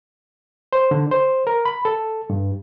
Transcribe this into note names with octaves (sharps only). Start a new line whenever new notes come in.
C5
D3
C5
A#4
B5
A4
G2